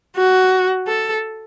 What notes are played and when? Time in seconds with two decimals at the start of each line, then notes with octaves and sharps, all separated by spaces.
0.16 F#4
0.87 A4